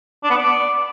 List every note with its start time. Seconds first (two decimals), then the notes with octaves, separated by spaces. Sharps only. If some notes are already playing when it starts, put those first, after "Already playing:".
0.24 D4
0.30 B3
0.37 D5